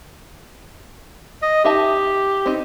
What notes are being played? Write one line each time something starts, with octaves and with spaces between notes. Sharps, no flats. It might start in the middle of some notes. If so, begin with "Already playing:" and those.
D#5
D#4 G4 E5 A5
C4 D#4